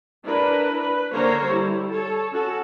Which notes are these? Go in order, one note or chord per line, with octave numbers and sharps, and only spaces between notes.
D4 E4 A#4 B4
B4
D3 A#3 A#4 C5 C#5 A#5
G3 E4
A4 C#5
C#4 F#4 A4